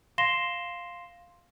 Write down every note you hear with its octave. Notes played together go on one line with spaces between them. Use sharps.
F5 C6 A#6 C7 E7 G7